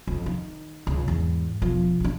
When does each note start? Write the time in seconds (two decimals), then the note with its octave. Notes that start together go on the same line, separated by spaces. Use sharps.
0.07 F2 C#3
0.26 D#3
0.87 C#2
1.08 E2 G#2
1.62 E1 F3
2.00 B1 D4